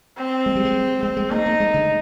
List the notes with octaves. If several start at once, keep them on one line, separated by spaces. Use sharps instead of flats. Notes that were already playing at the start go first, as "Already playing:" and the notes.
C4
G#3
G3
G#3
G#3 C4
G#3
A#3 D#4
A#3
G#3
D3